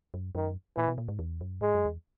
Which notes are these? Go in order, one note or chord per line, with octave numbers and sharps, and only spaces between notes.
F#2
F#2 D#3
A#2 E3
B2
A#2
G#2
E2
F#2
G#2 G#3
F#2
E2